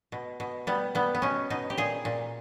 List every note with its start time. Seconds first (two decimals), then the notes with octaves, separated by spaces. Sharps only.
0.12 B2
0.40 B2
0.67 G3 B3
0.95 G3 B3
1.15 B3
1.22 B2 C#4
1.50 B2 D#4
1.70 G4
1.77 A#2 G#4
2.05 A#2